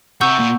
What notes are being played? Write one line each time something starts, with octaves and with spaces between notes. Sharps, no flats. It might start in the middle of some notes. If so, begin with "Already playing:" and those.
C3 F#5 A#5 C#6 E6 G6
A#2